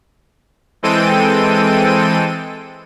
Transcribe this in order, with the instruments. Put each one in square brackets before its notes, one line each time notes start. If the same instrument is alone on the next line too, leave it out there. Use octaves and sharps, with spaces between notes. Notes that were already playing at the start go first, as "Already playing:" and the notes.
[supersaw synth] E3 G#3 C4 A4 G5 D#7